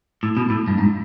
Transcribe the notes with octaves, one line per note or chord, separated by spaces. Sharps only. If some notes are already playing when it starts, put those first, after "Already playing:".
A2
B2
A2
G2
G#2